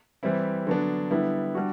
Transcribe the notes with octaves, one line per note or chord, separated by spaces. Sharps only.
E3 G3 C4 E4
D3 F#3 B3 D4
D3 G3 B3 E4
G3 D4 F#4